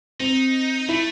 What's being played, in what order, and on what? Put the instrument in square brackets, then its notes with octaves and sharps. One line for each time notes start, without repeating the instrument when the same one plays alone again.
[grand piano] C4 [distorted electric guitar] D#4
[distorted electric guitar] A3 [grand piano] E4